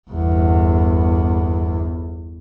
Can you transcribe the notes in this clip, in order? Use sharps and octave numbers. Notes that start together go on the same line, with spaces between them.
G1 E2